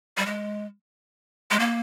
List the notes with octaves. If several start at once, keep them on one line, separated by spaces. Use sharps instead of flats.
G3
G#3
G#3
A#3